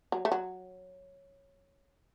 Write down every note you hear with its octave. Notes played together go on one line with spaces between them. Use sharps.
F#3
A3
F#3